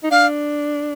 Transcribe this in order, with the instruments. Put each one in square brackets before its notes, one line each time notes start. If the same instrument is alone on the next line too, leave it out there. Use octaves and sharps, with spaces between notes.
[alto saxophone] D#4
[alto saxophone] D4 [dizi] F5